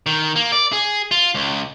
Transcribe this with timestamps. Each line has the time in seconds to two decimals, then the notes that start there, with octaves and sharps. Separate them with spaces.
0.06 D#3
0.36 A#3
0.52 D5
0.73 G#4
1.11 F4
1.35 C#2